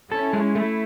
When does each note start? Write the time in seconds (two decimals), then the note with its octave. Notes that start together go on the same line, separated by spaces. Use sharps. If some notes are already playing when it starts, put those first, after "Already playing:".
0.11 C#4 E4 A4
0.33 G#3
0.55 A3 E4